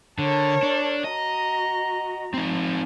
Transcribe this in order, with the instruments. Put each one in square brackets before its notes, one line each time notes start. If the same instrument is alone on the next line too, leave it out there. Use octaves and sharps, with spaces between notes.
[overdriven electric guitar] D3 [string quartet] A#4 C#5 A5
[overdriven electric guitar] D4
[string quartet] F#4 A#5 [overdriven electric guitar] D#5
[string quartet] F3 [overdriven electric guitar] C4 D#4